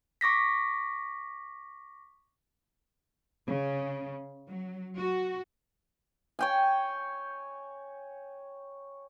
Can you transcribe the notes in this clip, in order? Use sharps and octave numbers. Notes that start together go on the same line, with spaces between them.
C#6 D6 A#6 B6
C#3
F#3
F#4
C#5 G5 G#5